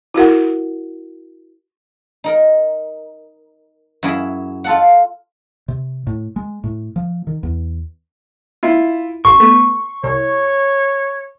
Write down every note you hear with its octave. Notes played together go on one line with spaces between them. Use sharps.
E4 F#4 A#4 F#5
D#4 A#4
F#2 E4 G#4
F4 A4 F#5
C3
A2
G#3
A2
F3
D#3
E2
E4 F4
A1 C6 C#6
A3 B3
C2 C#5